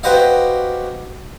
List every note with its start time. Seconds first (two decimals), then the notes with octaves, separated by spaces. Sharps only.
0.03 F#4 G4 B4 C5 D#5 F5